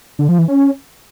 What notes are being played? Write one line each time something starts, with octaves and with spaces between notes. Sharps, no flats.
D3
F3
E3
C#4